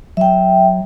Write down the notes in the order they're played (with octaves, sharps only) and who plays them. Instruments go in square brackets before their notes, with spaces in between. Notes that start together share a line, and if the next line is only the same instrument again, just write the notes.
[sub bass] F#3 [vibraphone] E5 G5